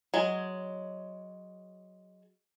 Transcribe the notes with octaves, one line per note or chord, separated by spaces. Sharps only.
F#3 G#3